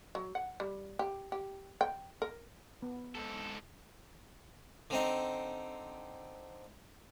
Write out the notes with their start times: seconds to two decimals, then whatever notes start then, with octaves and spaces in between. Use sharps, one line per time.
0.15 F#3
0.35 F#5
0.60 G3
0.99 G4
1.32 G4
1.81 G5
2.22 A#4
2.83 B3
3.15 G#2 A4
4.90 D3 C4 D#4